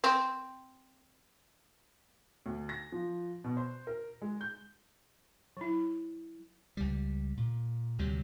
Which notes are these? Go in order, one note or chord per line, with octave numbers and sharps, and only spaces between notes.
C4
D2
A#6
F3
B2
C5
A#4
G#3
G6
F#3 E4
C#2 G3
A#2
D2 C3 F#3 G3